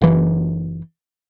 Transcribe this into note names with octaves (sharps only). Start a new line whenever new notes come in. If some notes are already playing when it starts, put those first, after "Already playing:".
F#1 E3